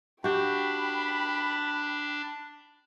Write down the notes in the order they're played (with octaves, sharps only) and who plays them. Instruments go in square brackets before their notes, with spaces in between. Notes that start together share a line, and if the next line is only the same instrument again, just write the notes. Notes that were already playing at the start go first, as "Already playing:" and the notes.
[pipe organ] D4 [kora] F#4 G4 [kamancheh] G5 B5